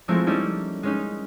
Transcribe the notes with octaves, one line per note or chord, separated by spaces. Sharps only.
F3 G#3 A3 C4 E4 A#4
G3 A#3 C#4 D#4 E4 A4
G#3 C#4 D#4